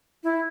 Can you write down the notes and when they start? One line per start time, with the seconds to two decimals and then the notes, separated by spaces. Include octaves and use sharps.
0.24 E4